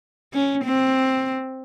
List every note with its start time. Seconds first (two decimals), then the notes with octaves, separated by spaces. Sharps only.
0.33 C#4
0.65 C4